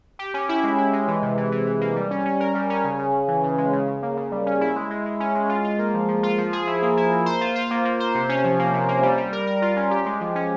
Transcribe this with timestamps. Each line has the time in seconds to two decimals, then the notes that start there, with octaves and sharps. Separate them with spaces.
0.19 G4
0.34 C#4
0.49 E4
0.64 G#3
0.78 E4
0.93 G#3
1.08 E3
1.22 C3
1.37 E3
1.52 E3
1.66 E3
1.81 A#3
1.96 G3
2.11 C#4
2.26 C#4
2.40 A#4
2.55 G3
2.70 C#4
2.84 C#3
2.99 C#3
3.14 C#3
3.28 E3
3.43 C#3
3.58 G#3
3.73 C#3
3.88 C#3
4.03 A#3
4.17 C#3
4.32 G3
4.46 C#4
4.61 E4
4.76 G#3
4.90 G#3
5.06 G#3
5.20 C#4
5.35 G#3
5.49 F4
5.64 F4
5.79 A#3
5.94 F3
6.08 F3
6.23 F4
6.38 F3
6.53 G#4
6.67 E4
6.82 A#3
6.97 E4
7.12 A#3
7.26 C5
7.41 F4
7.56 F4
7.71 A#3
7.85 A#3
8.00 C5
8.15 C3
8.29 C#4
8.44 F3
8.59 A#3
8.74 C3
8.89 A#3
9.03 G3
9.18 G3
9.33 A#4
9.47 A#4
9.62 F4
9.77 C#4
9.91 G4
10.06 G#3
10.21 F3
10.35 C#4